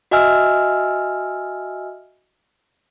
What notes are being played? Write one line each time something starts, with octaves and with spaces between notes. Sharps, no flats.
F#4 D#5 E5 G#5 E6 F6